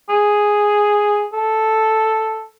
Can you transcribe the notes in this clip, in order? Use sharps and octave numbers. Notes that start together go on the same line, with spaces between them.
G#4
A4